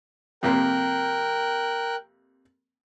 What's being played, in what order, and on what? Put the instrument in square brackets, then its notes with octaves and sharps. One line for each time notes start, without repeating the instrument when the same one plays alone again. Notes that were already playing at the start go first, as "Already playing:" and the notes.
[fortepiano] F2 C3 A#3 [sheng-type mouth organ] A#4 G5 F#6